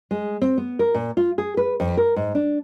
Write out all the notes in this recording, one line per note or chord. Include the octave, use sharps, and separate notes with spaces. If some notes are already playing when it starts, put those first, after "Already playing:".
G#3
C4
B3
A#4
A#2
F4
G#4
B4
F2
A#4
G#2
D4